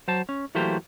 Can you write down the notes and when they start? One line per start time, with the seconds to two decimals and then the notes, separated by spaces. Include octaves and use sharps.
0.08 F#3 C5 A5
0.29 C#4
0.55 E3 F#3 A3 A#3 G4 C5